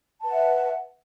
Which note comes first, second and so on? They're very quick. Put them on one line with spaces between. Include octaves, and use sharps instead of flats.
A5 B4 F#5 E5